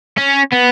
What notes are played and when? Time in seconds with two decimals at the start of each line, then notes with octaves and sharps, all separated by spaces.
0.18 C#4
0.53 B3